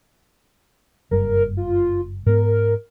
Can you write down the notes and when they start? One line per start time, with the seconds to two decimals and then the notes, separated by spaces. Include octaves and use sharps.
1.11 F#1 G2 A#4
1.57 F4
2.26 G#2 B3 A#4